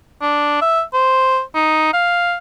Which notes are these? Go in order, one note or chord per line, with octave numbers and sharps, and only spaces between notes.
D4
E5
C5
D#4
F5